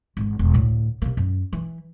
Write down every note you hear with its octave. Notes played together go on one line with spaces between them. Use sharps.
G#1 E3
E1
D2 A2
C3 A#3
F#2
E3